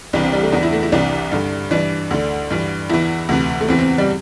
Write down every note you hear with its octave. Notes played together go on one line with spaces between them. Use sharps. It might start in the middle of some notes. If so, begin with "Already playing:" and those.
C2 C3 E3 D4
C4
G3
A3
E2 E3 D4
E4
A3
E4
C2 C3 E3 D4
G2 D3
G2 E3 D4
D2 D3
G2 E3
E2 E3 E4
D2 C3 E3
A3
E2 E3 C4
C4
G3